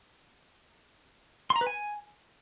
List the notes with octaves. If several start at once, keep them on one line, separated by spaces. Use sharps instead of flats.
C6
A#5
B4
G#5